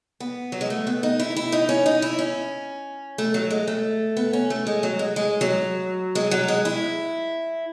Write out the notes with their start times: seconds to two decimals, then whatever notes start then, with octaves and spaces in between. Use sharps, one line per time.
0.20 B3
0.52 F#3
0.61 G#3
0.70 A3
0.87 B3
1.03 D#4
1.19 E4
1.36 E4
1.52 D#4
1.69 C#4
1.86 D#4
2.02 E4
2.19 C#4
3.18 A3
3.34 F#3
3.50 G#3
3.68 A3
4.17 B3
4.33 C#4
4.50 A3
4.67 G#3
4.83 F#3
4.99 G#3
5.16 G#3
5.41 F#3
6.15 G#3
6.31 F#3
6.48 G#3
6.65 E4